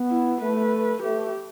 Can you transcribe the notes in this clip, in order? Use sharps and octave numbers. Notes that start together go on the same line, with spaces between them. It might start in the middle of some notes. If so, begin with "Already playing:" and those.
Already playing: B3
E4
A3 B4
A3 G4